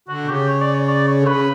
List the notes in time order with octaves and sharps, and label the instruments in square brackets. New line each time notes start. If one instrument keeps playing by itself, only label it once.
[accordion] D3 [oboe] F#4
[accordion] B2
[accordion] C#3 [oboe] G4
[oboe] C#5
D5
C#5
D5
C#5
[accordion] D3
[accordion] C#3 [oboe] B4